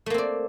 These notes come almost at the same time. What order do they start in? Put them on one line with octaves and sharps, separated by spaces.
A3 A#3 C4 D5